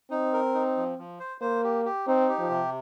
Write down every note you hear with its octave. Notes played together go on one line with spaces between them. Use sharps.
C4 D#4
A#4
D#4
F3
F3
C5
A#3 C5
G4
G4
C4 D#4
G4
F3
C3